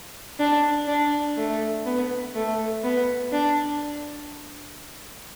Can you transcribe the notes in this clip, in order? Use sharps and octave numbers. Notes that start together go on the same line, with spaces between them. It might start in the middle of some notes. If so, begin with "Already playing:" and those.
D4
D4
A3
B3
A3
B3
D4